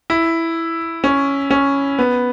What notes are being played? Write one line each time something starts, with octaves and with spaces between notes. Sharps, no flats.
E4
C#4
C#4
B3